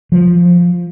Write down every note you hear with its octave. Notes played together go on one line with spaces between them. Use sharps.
F3